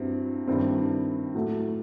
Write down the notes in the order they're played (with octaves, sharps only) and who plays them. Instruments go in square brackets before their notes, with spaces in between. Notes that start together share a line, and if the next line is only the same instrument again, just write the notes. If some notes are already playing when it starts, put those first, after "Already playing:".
Already playing: [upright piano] G2 F#3 C4 E4
G2 D#3 G3 C4 E4
A2 F#3 A3